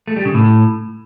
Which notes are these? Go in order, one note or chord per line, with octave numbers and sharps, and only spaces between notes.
A3
G3
C#3
A2